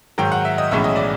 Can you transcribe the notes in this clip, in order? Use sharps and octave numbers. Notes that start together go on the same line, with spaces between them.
G#2 D#3 F#3 G5
F#5
E5
D#5
B1 A2 E3 G#3 C#4 E5
D#5
D5